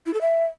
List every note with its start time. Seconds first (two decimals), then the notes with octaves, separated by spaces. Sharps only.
0.06 E4
0.14 A4
0.21 E5